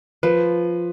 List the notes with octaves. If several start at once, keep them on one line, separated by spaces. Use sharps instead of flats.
F3 B4